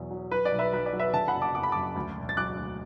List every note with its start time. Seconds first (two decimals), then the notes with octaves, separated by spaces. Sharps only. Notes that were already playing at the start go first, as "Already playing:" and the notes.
Already playing: E2 B2 F#3
0.11 F#3
0.31 F#3 B4
0.45 D5
0.52 B1
0.59 B4 E5
0.73 B1 B4
0.86 D5
0.93 F#3
0.99 B4 E5
1.13 D3 E5 A5
1.28 F#5 B5
1.35 F#1
1.41 A5 D6
1.55 F#1 D6
1.63 B5
1.72 F#2 A5 D6
1.96 D2
2.17 E1
2.29 A6
2.37 F#3 D6 F#6
2.58 D2